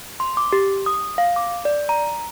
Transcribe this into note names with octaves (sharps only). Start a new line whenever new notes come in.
C6
D6
G4
D#6
F5
D6
D5
A#5